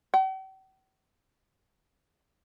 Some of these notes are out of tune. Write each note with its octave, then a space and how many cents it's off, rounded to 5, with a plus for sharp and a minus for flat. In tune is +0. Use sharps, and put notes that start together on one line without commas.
G5 -45